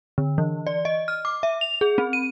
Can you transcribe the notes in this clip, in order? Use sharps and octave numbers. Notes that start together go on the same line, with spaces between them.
D3
E3
D5
D#5
F6
D6
E5
F7
G#4
C4
D#7